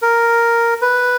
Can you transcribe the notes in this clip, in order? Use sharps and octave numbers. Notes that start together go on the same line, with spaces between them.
A#4
B4